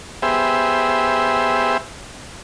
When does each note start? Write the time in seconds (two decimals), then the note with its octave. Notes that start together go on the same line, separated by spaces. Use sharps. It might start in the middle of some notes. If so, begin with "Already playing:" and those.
0.22 B3 G4 G#4 C5 E5